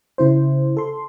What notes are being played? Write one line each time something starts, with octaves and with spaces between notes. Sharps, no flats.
C#3 E4 C5
A4 C6